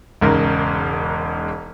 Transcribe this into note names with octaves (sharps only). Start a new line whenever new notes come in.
E1 G#2 C#3 A#4 A#5